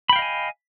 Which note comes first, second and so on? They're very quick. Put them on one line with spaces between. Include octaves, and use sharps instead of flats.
B5 G5 F5 D#5 G#5